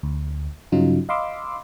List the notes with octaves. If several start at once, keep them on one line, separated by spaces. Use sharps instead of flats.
D2
G2 C#3 F#3 C#4 D#4 F4
D#5 F5 B5 C6 D6 E6